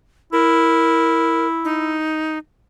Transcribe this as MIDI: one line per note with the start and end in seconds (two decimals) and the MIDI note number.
0.33 1.98 64
0.33 1.47 70
1.65 2.38 63